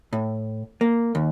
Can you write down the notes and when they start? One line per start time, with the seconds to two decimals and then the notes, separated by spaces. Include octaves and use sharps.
0.13 A2
0.81 A#3
1.15 D#2